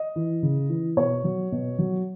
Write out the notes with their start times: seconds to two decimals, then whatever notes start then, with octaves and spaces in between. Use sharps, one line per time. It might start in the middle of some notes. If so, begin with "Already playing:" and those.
Already playing: D#5
0.16 E3
0.43 C#3
0.69 E3
0.97 B2 C#5
1.24 F#3
1.52 B2
1.78 F#3